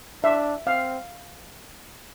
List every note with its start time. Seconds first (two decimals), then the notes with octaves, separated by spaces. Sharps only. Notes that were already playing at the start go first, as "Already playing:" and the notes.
0.23 D4 E5
0.67 C4 F5